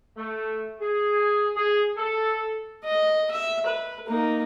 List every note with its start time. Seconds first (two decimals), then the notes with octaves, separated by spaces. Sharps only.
0.17 A3
0.80 G#4
1.56 G#4
1.97 A4
2.84 D#5
3.31 E5
3.66 B4
4.08 A#3 D#4